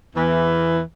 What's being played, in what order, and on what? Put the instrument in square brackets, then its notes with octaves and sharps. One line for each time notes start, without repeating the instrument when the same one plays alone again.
[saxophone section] E2 E3